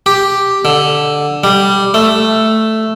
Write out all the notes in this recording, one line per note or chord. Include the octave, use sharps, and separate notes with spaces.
G4
D3
G3
A3